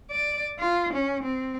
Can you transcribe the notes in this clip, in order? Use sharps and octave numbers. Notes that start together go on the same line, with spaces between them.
D5
F4
C#4
C4